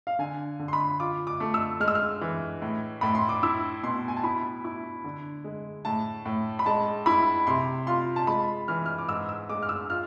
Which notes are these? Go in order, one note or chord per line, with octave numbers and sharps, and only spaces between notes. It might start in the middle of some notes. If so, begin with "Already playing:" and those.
F5
D3 G#5
D3
C6
B5
F4 D6
D6
A3
E6
G#3 F6
E6
F6
E3
A2
A2 B5
C6
D6
E4 E6
B2 C6
G#5
A5
E4 B5
E4
D3
G#3
A2 A5
A2
B5
G#3 A5
E4 B5
C3 C6
F4 C6
A5
G#3 B5
E3 F6
F6
D6
G#2 E6
E6
G#3 D6
F6
E6
F4 F6